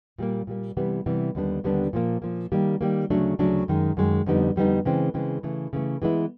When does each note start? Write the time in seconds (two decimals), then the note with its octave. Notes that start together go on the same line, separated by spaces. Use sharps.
0.18 A#2 G3 A#3
0.47 A#2 G3 A#3
0.77 C3 E3 G3 B3
1.06 C3 E3 G3 B3
1.35 D#2 D3 G3 B3 D4
1.64 D#2 D3 G3 B3 D4
1.93 A#2 F3 A#3
2.22 A#2 F3 A#3
2.52 D#3 G3 A#3
2.81 D#3 G3 A#3
3.10 D2 C#3 F#3 A3 D4
3.39 D2 C#3 F#3 A3 D4
3.68 F#2 D#3 G#3
3.97 F#2 D#3 G#3
4.26 F2 D3 G3 B3 D#4
4.56 F2 D3 G3 B3 D#4
4.85 C#3 E3 G#3 C4
5.14 C#3 E3 G#3 C4
5.43 C#3 E3 A3
5.73 C#3 E3 A3
6.02 E3 G#3 B3 E4